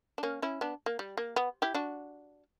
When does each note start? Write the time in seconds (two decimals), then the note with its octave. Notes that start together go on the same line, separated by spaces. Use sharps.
0.18 D4
0.23 A#3 C#4
0.42 C#4 E4
0.61 B3 D4
0.86 A#3
0.99 G3
1.17 A#3
1.36 B3
1.62 E4 G4
1.74 D4 F#4